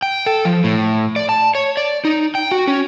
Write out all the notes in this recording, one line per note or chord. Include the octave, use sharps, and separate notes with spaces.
G5
A4
F3
A2
D5
A5
C#5
D5
D#4
G5
F#4
C#4